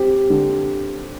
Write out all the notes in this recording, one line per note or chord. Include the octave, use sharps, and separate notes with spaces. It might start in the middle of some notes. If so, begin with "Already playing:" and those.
Already playing: C4 G4
D3